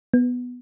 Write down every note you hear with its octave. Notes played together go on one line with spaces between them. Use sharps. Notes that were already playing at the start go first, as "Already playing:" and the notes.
B3